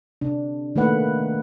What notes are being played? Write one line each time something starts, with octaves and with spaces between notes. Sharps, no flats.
C3 D4
D#3 A3 A#3 B4 F#5